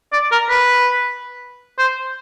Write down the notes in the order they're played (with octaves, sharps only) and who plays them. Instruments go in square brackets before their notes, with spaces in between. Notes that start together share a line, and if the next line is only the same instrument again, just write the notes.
[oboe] D5
A#4
B4
C5